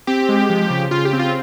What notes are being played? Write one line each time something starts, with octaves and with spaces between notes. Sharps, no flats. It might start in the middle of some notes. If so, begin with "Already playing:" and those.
C4 G4
G#3
F3
C#3
C#3 F4
G4
C4
F4